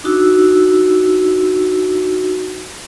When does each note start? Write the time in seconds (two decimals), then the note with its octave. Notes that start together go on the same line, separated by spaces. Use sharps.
0.04 D4 D#4 F#4 E6